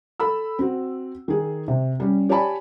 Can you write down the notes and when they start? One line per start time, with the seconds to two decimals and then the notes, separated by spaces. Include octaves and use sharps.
0.20 A4 B5 E6
0.59 C4 F#4
1.28 D#3 G#4
1.68 C3
2.00 G3 C#4
2.29 G4 C#5 D5 G#5 A5 B5